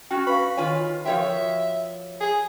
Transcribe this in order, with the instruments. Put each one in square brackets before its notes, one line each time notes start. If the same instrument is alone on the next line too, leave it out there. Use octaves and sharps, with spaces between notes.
[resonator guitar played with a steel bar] C#4 F#4 [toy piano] G5
[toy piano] B4 F5 [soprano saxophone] B5
[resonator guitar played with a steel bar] D#3 F4 G#5 [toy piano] C#5
[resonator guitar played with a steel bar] F3 C#5 G5 [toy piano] F#4 A#4 [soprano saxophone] E5
[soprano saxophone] G#4